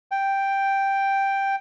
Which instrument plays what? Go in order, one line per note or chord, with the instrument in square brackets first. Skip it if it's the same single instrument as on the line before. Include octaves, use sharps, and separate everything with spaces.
[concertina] G5